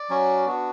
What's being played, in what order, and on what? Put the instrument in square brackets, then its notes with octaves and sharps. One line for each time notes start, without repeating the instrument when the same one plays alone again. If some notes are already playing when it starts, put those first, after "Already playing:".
Already playing: [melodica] D5
F#3 C#4 F#4
B3 D4 F#4